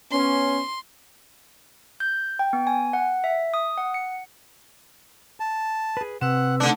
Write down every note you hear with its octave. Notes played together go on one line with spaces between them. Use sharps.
B3 C#4 C6
G6
G5
B3
G#5
F#5
E5
D#6
F#5
C#7
A5
G#4 B4
C3 C4 B4 F#5 E6
D3 A3 D4 D#4